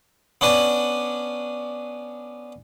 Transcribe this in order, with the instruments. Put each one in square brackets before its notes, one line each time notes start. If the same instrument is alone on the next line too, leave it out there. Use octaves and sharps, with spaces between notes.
[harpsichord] B3 C#4 D4 B4